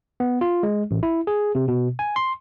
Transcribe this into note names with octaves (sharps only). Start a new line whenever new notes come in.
B3
F4
G#3
A1
E4
G#4
C3
B2
G#5
C6